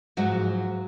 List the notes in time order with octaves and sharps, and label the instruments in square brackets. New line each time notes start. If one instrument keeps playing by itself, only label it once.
[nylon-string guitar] G#2 F3 F#3 F#4